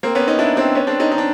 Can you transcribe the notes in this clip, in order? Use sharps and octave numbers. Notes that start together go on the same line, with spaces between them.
A#3 C4
B3 C#4
C#4 D#4
D4 E4
C4 D4
B3 C#4
C4 D4
C#4 D#4
D#4
D4